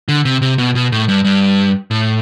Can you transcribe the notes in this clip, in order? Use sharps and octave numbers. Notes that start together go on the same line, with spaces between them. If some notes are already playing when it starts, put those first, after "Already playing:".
D3
C3
C3
B2
B2
A2
G2
G2
A2